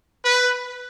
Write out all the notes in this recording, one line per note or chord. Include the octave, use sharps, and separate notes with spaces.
B4